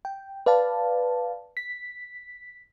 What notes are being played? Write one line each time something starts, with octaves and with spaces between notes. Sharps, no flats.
G5
B4 D5 F5 A5
B6